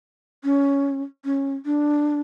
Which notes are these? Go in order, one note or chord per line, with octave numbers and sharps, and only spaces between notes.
C#4
C#4
D4